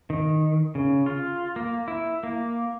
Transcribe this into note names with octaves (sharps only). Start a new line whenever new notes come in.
D#3
C#3
F4
A#3
E4
A#3